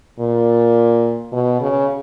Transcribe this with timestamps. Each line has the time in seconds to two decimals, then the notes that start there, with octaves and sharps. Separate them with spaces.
0.20 A#2
1.33 B2
1.61 C#3